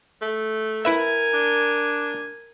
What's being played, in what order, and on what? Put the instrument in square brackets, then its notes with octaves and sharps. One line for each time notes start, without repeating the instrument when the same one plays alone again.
[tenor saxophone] A3
[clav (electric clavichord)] E4 B4 E5 [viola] A#4 G#5
[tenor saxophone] D4